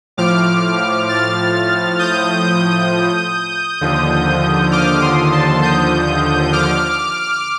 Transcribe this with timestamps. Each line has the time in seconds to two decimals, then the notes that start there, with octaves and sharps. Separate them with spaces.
0.17 A2 F3 D6 F6
1.09 F6 A6
1.99 D#6 G6
3.81 D#2 D3 F3
4.72 D6 F6
5.02 C6 D#6
5.32 A5 C6
5.62 D#6 G6
6.53 D6 F6